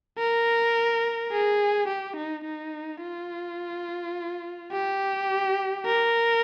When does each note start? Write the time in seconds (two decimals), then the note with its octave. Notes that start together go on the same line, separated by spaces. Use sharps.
0.18 A#4
1.32 G#4
1.88 G4
2.17 D#4
2.45 D#4
3.02 F4
4.73 G4
5.86 A#4